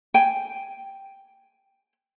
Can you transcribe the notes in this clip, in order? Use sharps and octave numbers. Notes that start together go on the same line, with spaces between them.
G5 G#5